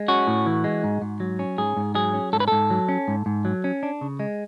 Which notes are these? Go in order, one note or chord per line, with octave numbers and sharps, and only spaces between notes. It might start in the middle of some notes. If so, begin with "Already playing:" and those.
Already playing: G#3
C#4 F#4
A2
E3
G#3
G#2
G#2
F#3
C#4
G#2 G#4
G#2
F#3 G#4
C#4
G#2 A4
B4
G#2 A4
F#3
C#4
G#2
G#2
F#3
C#4
D4
C#3
G#3